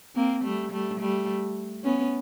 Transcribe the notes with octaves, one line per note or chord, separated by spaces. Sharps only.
A#3 C4
G3 A3
G3 A3
G3 A3
B3 C#4